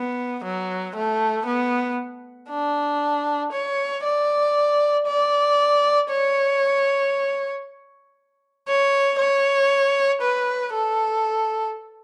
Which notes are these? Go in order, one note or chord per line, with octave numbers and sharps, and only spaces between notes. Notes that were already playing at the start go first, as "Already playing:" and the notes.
Already playing: B3
F#3
A3
B3
D4
C#5
D5
D5
C#5
C#5
C#5
B4
A4